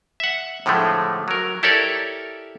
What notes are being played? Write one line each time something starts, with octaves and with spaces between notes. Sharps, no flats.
E5 F#5
A2 D3 F3 G#3 A3
F#3 A#4
E4 G4 A4 A#4 C#5 D5